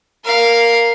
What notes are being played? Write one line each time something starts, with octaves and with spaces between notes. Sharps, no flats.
A#4 F5